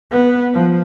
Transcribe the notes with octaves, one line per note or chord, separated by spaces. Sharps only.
B3
F3